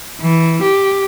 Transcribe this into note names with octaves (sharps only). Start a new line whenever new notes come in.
E3
G4